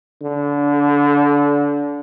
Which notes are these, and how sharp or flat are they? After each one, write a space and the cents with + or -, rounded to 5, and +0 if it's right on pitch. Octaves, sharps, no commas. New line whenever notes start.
D3 -25